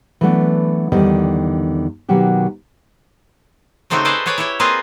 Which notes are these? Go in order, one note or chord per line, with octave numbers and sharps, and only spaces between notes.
E3 F#3 A3 B3 D4
E2 D3 D#3 G3 D#5
B2 D#3 F#3 A#3 F#4 G4
C#3 A3 C4 D#4 F#4 G4
G#4 A4 B4 C5 D5 D#5
G#4 B4 C#5 D5 G#5
E4 G4 C#5
A#3 C4 F4 G#4 B4 D#5